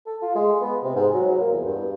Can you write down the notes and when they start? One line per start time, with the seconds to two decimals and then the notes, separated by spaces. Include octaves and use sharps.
0.06 A4
0.22 F4
0.35 G#3
0.61 B3
0.83 C3
0.95 G#2
1.14 F#3
1.27 F#3
1.40 A#3
1.53 E2
1.66 G2